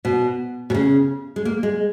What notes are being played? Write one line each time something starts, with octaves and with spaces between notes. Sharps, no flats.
B2
B2
C#3
G#3
A#3
G#3